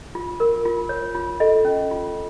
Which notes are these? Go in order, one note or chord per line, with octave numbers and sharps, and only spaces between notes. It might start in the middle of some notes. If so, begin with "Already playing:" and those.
F4
A#4
F4
C#5
F4
A4 D#5
C#4
F4